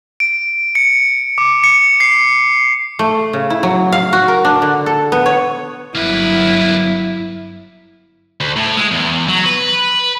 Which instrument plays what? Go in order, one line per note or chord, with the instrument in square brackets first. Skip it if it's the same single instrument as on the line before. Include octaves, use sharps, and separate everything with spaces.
[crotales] D7
C#7
D6
C#7
C7
[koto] A3
C#3
E4
F#3
F5
F#4
A#4
D4
D3
A4
B3
C#5
[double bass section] G1 F#3 [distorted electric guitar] A#3 B4 [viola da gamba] E4
[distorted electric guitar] D2
A2
G#3
E2
F#3
B4